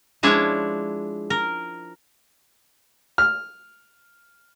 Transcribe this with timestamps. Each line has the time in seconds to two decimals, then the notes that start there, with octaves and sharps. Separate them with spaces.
0.23 F3 G#3 D4 E4 C#5
1.30 A#4
3.18 F6